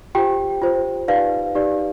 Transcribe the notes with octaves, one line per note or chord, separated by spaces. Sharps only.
F4 G4 C5 G5
F4 C5
D#4 G4 B4 D5 F5
D#4 G4 B4 D5